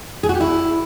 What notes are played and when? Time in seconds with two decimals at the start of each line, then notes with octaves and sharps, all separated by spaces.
0.23 G#4
0.29 F#4
0.35 G4
0.41 E4